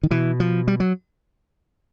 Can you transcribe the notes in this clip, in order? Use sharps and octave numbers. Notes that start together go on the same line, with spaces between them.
D#3
B2 E3
F3
G3
F#3